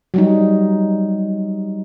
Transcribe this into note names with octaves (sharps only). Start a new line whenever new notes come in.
F#3 G3 D#4